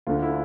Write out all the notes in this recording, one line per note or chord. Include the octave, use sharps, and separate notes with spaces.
D2 D3 F4
E4